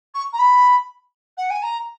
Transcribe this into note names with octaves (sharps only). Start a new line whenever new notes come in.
C#6
A#5
B5
F#5
G#5
A#5